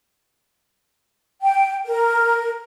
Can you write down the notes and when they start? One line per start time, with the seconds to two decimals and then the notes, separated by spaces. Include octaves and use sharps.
1.42 G5
1.85 A#4